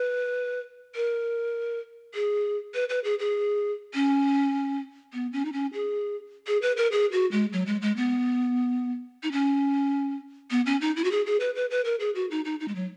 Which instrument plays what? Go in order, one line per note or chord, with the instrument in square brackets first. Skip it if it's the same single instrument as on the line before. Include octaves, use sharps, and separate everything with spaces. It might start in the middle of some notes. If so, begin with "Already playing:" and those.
Already playing: [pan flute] B4
A#4
G#4
B4
B4
G#4
G#4
C#4
B3
C#4
D#4
C#4
G#4
G#4
B4
A#4
G#4
F#4
G#3
F#3
G#3
G#3
B3
D#4
C#4
B3
C#4
D#4
E4
F#4
G#4
G#4
B4
B4
B4
A#4
G#4
F#4
D#4
D#4
D#4
G#3
F#3